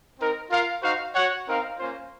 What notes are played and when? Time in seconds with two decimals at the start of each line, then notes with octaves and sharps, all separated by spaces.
0.18 C4 D#4 A#4
0.50 F4 A#4 F5
0.82 D#4 F#4 C5 F5
1.14 F#4 C#5 F#5
1.46 C4 D#4 A#4 F5
1.78 A#3 C#4 F4 C5